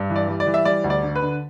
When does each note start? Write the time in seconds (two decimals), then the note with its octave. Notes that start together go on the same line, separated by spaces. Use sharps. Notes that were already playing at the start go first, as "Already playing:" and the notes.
Already playing: G2
0.10 E3
0.16 D5
0.28 G3
0.40 D5
0.47 E3
0.54 E5
0.65 G3 D5
0.84 D2
0.90 D5
1.03 D3
1.16 B4
1.22 D3